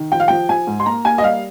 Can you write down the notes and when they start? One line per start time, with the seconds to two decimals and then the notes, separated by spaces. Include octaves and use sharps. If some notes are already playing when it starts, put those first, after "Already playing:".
Already playing: D#3
0.12 F3 G5
0.20 F5
0.28 F3 G5
0.49 F3 G#5
0.67 G#2
0.80 C6
0.86 A#3 A#5
1.05 A#3 G#5
1.18 D#5
1.23 G3 F5